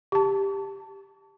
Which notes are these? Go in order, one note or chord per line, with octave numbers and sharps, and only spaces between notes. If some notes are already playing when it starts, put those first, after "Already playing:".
G4 A5